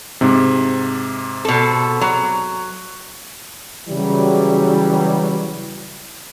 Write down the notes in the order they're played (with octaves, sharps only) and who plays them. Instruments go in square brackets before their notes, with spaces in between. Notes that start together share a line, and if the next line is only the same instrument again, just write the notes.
[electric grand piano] G#2 C3
[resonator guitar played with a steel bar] B2 A4
F#3
[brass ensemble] C#3 E3 F#3 G3